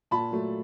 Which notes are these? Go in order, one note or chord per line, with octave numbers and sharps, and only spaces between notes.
A#2 A5 B5
F#3 A3